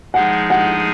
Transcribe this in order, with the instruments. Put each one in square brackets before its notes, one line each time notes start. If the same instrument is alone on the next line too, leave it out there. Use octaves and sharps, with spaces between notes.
[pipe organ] F3 G#3 D#4 G#4 [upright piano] F#5
[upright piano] F#5